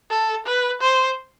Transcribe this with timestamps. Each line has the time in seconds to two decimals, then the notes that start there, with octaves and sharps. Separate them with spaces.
0.10 A4
0.46 B4
0.81 C5